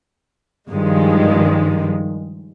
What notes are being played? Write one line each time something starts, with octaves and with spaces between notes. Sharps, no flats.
G2 D#3 F3 G#3